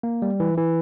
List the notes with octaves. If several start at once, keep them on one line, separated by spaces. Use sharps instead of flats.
A#3
G3
E3
E3